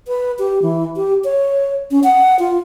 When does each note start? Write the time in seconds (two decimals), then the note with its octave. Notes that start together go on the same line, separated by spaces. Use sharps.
0.08 B4
0.39 G4
0.62 E3
0.96 G4
1.24 C#5
1.91 C#4
2.04 F#5
2.39 F4